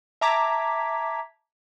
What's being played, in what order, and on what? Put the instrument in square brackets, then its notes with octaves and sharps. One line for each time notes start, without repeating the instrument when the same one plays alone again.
[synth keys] E5 A5 A#5 D6 G#6 B6